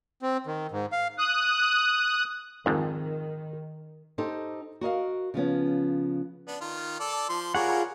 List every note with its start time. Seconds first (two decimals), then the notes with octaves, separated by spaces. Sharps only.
0.22 C4
0.47 D#3
0.71 G#2
0.92 F5
1.18 D#6 F#6
2.66 F2 G#2 D#3
4.18 D#4 G4 A4 C5
4.81 F#4 A#4 D#5 F5
5.34 C#3 F3 B3 C#4
6.48 B3 D4
6.61 D#3 F4
7.00 A4 D5
7.29 F3 C6
7.55 G3 F4 G#4 A#4 C#5 F#5